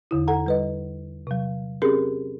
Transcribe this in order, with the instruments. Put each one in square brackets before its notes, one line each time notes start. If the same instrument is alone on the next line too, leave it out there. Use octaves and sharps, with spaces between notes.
[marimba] E2 D3 E4
A4 F#5 A#5
G3 B4 D#5
C3 F#3
C4 C#4 G4 G#4 A#4